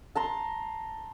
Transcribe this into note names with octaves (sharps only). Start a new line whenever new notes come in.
A5 A#5 C6